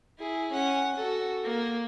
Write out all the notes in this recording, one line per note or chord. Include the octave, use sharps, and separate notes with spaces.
E4 G#4
C#4 F#5
F#4 A4
A#3